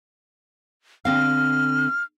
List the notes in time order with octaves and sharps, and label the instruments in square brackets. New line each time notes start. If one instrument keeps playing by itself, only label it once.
[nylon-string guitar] D3 C4 F5 [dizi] F6